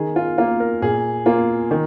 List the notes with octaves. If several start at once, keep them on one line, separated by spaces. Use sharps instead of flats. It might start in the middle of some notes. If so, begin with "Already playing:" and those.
Already playing: D#3 G#4
F4
A#3 F4
A#4
A#2 G#4
A#3 F4
D#3